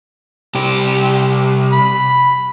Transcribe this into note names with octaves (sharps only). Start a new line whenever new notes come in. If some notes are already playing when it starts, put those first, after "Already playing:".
C2 G4
B5